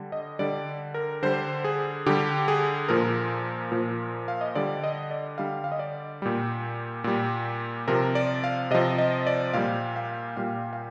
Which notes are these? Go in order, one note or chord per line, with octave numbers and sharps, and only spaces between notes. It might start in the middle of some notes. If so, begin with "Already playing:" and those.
Already playing: D3 G3
D#5
D3 G3 D5
A#4
D3 G3 C5
G#4
D3 G3 G4
G#4
A#2 F3 A#4
A#2 F3
F5
D#5
D3 G3 D5
D#5
D5
D3 G3 F5
F5
D#5
D5
A#2 G3
A#2 G3
C3 F3 A#4
D5
F5
C3 F3 D#5
D#5
D5
A#2 G3 F5
F5
A#2 G3 F5
F5